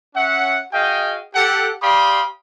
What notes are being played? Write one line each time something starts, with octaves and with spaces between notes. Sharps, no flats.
C#4 E5 F#5
F#4 G#4 D#5 F5 G5
G4 A4 F#5
G4 D5 F5 B5 C6 D#6